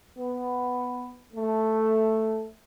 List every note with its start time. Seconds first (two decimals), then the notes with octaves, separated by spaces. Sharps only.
0.18 B3
1.34 A3